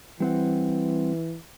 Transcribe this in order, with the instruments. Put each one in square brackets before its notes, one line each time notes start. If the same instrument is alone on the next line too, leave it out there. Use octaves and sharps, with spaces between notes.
[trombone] E3 [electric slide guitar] G3 C4 F#5